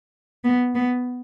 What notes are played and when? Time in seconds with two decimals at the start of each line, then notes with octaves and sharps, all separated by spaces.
0.44 B3
0.75 B3